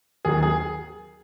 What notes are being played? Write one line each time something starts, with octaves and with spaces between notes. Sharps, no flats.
D#2 D#3 F#3 G#4
G#4